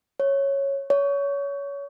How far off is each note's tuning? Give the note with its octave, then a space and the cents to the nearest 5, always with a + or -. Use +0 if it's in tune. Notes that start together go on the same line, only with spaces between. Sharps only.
C#5 -5
C#5 +25